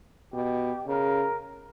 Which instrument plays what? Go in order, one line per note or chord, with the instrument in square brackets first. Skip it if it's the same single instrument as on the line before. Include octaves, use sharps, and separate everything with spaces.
[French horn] B2 [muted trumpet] G4
[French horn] C#3 [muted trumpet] A#4